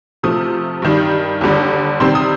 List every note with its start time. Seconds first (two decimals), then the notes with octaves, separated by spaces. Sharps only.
0.23 C3 F3 A3 D#6
0.82 G2 D#3 G3
1.41 D#2 D3 G3
2.00 C3 D#3 G3 C4 C6
2.15 D#6